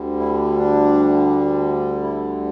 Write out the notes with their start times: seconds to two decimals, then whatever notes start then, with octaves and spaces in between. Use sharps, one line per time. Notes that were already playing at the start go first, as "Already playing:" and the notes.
Already playing: D2 D3 G3
0.20 E4
0.57 D4
2.02 E4